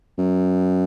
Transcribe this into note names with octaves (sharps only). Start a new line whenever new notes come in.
F#2